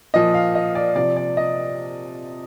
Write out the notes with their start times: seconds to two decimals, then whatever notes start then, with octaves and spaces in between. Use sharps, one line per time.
0.14 A#2 F3 D#5
0.34 F5
0.55 D#5
0.75 D5
0.96 C3 F3 D5
1.16 D5
1.37 D#5